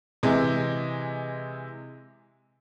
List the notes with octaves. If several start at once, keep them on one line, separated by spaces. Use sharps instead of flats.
C3 E3 G#3